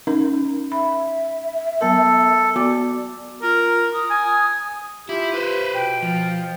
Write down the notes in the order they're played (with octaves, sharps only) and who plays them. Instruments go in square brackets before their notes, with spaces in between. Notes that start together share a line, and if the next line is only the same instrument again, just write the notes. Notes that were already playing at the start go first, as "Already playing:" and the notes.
[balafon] C#4 D#4 A#4
[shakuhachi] E5 [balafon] B5
[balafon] F#3 B3 A#4 [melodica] A4
[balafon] B3 F#4 D6 [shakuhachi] D5
[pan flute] F4 [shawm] A#4
[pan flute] D#6
[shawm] G#5
[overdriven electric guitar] E4 [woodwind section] F4 G4
[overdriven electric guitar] B4 C5
[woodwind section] B2 G5
[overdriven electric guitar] F3